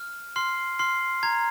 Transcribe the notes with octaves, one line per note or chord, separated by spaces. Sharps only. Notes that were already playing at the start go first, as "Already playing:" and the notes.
Already playing: F6
C6 F6 C7
C6 F6 C7
A#5 G#6